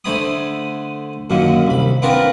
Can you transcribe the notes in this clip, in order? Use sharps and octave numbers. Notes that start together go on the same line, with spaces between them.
D3 A3 C5 G#5 B5 D#6
F#2 A#2 D3 D#3
C2 B5
B3 C4 D4 F4 A#4 B4